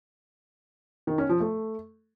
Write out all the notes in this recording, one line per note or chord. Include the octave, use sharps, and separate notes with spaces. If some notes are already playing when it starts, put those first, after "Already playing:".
D#3
C#4
F3
A3